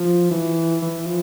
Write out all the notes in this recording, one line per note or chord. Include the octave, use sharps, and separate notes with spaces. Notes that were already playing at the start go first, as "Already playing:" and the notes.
Already playing: F3
E3
E3
F3